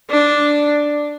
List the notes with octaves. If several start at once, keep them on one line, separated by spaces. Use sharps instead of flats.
D4